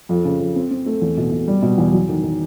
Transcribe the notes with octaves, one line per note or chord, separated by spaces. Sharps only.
F2
C#3
F2
C4
C4
A3
E2
B2
B2
G3
B2
E2
F#3
D#3
D#3